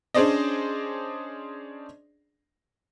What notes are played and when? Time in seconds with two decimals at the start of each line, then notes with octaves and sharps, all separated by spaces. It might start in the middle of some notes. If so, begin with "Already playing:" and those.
0.14 C#4 D4 G#4 C5 D5 D#5